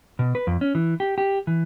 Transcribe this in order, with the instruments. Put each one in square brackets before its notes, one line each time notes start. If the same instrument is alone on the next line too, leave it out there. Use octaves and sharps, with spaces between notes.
[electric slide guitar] B2
B4
F2
C#4
E3
G4
G4
E3